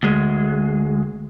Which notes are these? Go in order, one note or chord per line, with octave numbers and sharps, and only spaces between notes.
D2 G#3